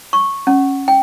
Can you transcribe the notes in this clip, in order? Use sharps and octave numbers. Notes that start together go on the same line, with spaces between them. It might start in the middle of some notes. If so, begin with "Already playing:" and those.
C#6
C#4
G5